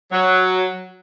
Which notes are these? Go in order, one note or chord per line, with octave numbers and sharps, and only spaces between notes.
F#3